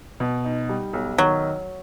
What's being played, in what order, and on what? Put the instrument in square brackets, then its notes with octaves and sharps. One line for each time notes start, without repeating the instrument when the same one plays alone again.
[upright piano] B2
D#4
G3
B1
[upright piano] D#3 [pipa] F#3